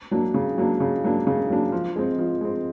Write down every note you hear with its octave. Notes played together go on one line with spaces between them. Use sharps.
F#3 A#3 D4
C#3
F#3 A#3 D4
C#3
F#3 A#3 D4
C#3
F#3 A#3 D4
F3
G#3 C4
F3
G#3 C4